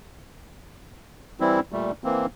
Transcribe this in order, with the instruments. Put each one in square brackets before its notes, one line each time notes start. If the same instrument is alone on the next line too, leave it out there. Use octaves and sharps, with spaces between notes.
[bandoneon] E3 G3 C4 E4
A#2 G3 A3
E3 A#3 C4